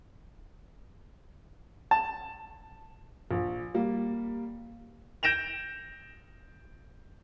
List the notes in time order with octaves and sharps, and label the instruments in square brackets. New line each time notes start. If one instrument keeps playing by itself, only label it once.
[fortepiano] A5
[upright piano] A#1
G3 A#3
[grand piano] G6 A#6 D7 E7 F7